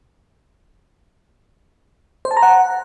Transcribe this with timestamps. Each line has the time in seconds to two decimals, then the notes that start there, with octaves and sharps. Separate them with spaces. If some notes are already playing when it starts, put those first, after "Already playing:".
2.25 C5
2.31 A5
2.37 A#5
2.43 F#5